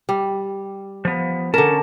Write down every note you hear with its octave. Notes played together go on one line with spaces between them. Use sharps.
G3
F3 B3
D3 C#4 A#4 A5